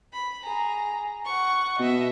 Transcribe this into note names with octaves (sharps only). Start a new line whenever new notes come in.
B5
G#4 A#5
F#5 C#6
B2 D#5 E5